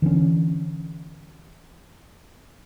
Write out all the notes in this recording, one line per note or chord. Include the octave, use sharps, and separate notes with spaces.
D3 E3 G3 C#4